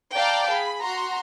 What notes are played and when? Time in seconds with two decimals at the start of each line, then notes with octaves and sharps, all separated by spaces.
0.14 D5 F5 G5 A5 A#5
0.49 G#4 B5
0.82 F#4 A#5 C6